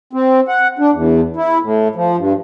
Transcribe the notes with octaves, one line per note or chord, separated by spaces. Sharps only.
C4
F#5
D4
E2
E4
A2
F3
G2